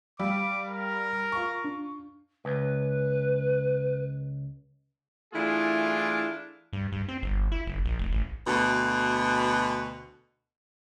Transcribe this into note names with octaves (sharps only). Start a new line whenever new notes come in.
G3 F5 D6 E6
A#4
F4 C#6
D4
C#2 B4
E3 A3 D4 E4 F4 G#4
G2
G2
C4
G1
E4
F#1
A#1
F1
A1
D2 B2